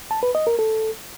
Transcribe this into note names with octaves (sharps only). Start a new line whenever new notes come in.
A5
B4
D#5
A#4
A4